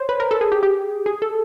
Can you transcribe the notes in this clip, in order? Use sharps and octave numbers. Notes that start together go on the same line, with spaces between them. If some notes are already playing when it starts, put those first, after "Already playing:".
Already playing: C5 C#5
B4
A#4
A4
G#4
G4
G4
G#4
A4